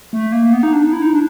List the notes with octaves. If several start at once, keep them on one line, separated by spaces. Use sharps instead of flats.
A3
A#3
B3
D#4
D4
D#4
E4
D#4
D4